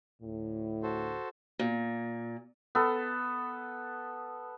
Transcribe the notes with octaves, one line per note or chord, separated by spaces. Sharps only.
D2 A2
F#4 A4 C5
A#2
B3 A4